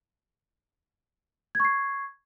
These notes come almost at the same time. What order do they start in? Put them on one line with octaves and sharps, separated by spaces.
G#6 C#6 C7